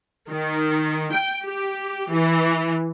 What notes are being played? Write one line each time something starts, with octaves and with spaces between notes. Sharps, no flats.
D#3
G5
G4
E3